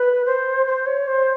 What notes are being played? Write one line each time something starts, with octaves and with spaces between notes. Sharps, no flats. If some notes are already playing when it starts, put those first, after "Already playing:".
Already playing: B4
C5
C5
C#5
C5